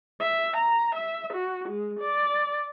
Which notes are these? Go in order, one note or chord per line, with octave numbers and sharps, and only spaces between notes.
E5
A#5
E5
F#4
G#3
D5